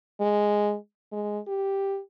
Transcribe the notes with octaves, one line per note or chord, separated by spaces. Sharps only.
G#3
G#3
G4